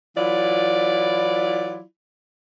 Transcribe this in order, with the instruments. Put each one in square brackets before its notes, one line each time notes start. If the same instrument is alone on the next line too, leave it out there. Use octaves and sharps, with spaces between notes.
[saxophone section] E3 F#3 E4 F4 D5